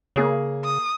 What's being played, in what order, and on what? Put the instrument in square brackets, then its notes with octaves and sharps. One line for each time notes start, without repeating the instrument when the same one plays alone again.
[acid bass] C#3 [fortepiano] A#3 G#4 C#5
[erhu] D#6